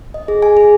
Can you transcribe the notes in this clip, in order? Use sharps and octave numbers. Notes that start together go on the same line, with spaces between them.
D#5
G#4
G#5
G#4